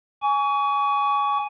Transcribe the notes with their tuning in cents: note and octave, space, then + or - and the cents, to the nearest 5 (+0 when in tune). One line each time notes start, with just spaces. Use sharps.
G#5 +0 C#6 +35